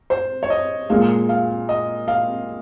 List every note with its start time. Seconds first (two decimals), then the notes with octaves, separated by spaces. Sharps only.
0.10 C5
0.43 C#5
0.50 D#5
0.90 A#2 G#3 F5
1.29 F5
1.69 D#5
2.08 F5